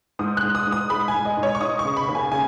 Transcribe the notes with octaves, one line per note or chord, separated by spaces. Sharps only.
G#2 D#6
F#6
G#2
D#6
G#2
D#6
G#3 B5
G#5
G#2
D#5
G#2
C#5
C#6
D#4 D#6
C#6
C#3
B5
D#2
G#5
C#3 G#5